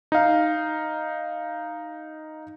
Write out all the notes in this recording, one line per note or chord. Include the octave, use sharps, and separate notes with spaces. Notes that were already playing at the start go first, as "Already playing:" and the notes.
D#4 F5